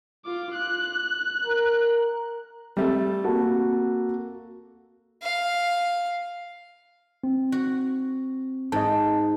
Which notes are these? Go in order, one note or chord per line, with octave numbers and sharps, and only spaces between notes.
F4 D6
F#6
A#4
G3 A3 C4
A#3 F#4 A4
F5
C4
F#4
G#2 D#5 A5